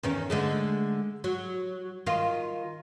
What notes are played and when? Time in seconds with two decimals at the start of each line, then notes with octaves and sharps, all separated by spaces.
0.03 E2 D#3 C#4
0.30 D3 G#3 A3
1.24 F#3
2.06 D#3 F4